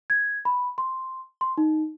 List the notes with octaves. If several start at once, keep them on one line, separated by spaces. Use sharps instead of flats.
G#6
B5
C6
C6
D#4